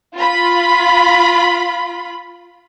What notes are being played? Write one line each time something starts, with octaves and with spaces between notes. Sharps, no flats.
F4 B5